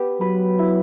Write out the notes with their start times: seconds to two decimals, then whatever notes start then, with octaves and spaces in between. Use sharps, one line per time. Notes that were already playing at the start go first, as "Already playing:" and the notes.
Already playing: B3 G4
0.21 F#3 B4
0.59 E4